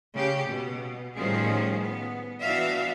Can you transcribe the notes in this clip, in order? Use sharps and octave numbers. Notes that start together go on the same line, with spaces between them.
C#3 G4
B2
A2 D#3 F3 G3 C#4 G#4
B3
E3 B3 D4 F#4 E5 F5